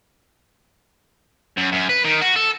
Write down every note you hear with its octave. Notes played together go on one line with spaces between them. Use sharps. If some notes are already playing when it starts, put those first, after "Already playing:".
F#2
F#2
B4
D#3
F#4
A4